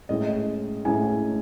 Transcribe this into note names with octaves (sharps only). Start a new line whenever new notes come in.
A2 G#3 C#4 E4 D#5
A2 G#3 C#4 E4 G#5